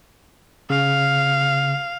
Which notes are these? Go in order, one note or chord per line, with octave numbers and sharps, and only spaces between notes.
C#3 F5